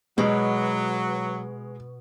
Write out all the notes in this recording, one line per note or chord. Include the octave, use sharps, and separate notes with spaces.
B2 F#3 G#3